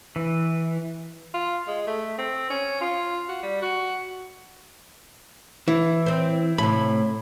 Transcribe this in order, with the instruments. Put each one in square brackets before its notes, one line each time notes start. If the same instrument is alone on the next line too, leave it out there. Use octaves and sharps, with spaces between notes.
[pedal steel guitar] E3
[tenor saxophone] F4
G#3
A3
C4
C#4
F4
F#4
G3
F#4
[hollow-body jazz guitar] E3 [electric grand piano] E4
[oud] C4 C5
[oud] A2 C3 [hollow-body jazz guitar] B5